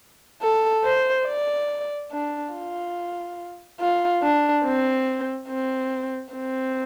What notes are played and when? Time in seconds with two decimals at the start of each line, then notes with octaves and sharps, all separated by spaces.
0.42 A4
0.84 C5
1.27 D5
2.11 D4
2.54 F4
3.80 F4
4.23 D4
4.65 C4
5.49 C4
6.34 C4